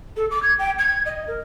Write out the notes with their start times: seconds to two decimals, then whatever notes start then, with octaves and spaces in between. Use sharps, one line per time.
0.16 A4
0.30 D6
0.42 G#6
0.58 G5
0.78 G#6
1.05 D#5
1.27 A#4